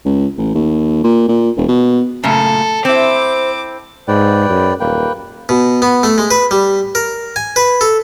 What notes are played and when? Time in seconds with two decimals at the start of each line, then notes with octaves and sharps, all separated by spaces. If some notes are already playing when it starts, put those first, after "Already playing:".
0.05 C#2
0.37 A1
0.55 D#2
1.04 A#2
1.28 A#2
1.57 E1
1.68 B2
2.24 F#2 A#2 C#3 A3 A4
2.85 C4 E4 C5 D6
4.08 G#2 B4 D5 G5
4.49 F#2
4.80 D#1 A#3 B4 G5
5.49 B2
5.82 B3
6.03 A3
6.18 G#3
6.31 B4
6.51 G3
6.95 A#4
7.36 G#5
7.56 B4
7.81 A4